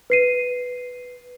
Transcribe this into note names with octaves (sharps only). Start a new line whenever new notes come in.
B4 C7 D#7